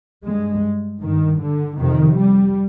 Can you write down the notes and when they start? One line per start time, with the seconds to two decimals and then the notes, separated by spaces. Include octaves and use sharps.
0.24 G2 G#3
1.01 G2 D#3
1.40 D3
1.78 F2 C3 D#3
2.17 G3